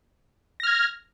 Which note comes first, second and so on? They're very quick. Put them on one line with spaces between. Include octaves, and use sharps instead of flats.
A#6 F6 G#6